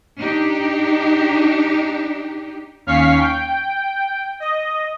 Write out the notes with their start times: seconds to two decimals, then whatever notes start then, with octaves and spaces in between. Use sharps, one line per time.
0.18 D4 D#4 G4
2.86 D#2 C#4 F5 C#6 B6 C7
3.20 G5
4.40 D#5